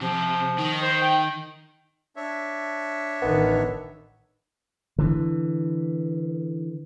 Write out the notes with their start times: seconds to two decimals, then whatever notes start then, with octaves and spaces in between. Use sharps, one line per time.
0.01 C3 F3
0.58 D#3 D#4
0.82 C5
1.01 G5
2.16 D4 C#5 E5
3.22 A1 D#3 B3
4.99 D3 E3